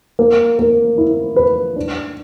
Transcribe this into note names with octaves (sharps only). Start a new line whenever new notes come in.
A#3
A#3
E4
B4
D4